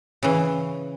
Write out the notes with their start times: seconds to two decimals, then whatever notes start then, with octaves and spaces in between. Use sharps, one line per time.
0.23 C#3 E3